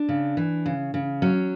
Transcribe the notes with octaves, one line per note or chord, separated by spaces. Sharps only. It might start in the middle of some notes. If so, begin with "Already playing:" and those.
Already playing: D4
C#3
E3
C#3
C#3
F#3 C#4